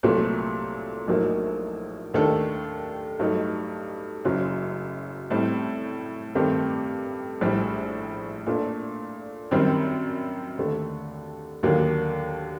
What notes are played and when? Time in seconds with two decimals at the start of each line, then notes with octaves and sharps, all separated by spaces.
0.03 C2 A#2 F#3 A3
1.08 A#1 A2 F#3 A#3 D#4
2.14 D#2 D#3 A3 D4 A4
3.19 G2 F#3 A3 D#4
4.25 F#1 F#2 F#3
5.31 A2 G3 C4
6.35 G2 D#3 A3 C4 G4
7.41 A#1 A2 G3
8.47 A#2 A3 D4
9.51 F#2 D#3 G3 C4
10.58 D#2 D3 A3
11.63 D#2 D3 F#3 A#3